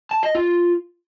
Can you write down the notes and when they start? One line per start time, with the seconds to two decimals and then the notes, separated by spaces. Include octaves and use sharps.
0.11 A5
0.23 D#5
0.35 F4